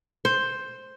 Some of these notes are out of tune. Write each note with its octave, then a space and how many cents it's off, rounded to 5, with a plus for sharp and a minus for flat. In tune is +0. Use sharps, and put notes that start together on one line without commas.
C5 +5